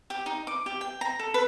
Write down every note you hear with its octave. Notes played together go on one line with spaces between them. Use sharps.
G4
D#4
D6
G4
G5
A#5
A4
B4